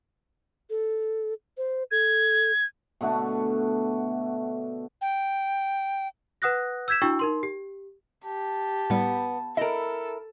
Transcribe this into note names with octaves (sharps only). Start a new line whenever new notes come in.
A4
C5
A4 G#6
B2 D3 A3 F#4
G5
B4 F#5 D#6 F#6 A#6
E6 G6 G#6 B6 E7
D4 E4 F#4 G5 C#6 E6
D#4 A#4 C6
G4
G4 A5
A2 G3 B3
E4 A4 A#4 D#5